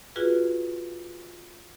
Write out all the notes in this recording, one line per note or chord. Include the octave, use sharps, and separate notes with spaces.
F4 F#4 G#4 B4